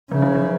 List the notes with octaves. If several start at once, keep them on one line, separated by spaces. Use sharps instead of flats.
C#3 F3
F#3
F3